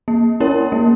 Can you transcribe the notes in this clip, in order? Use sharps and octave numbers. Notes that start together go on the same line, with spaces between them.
A#3
C#4 E4 A#4 C#5
A#3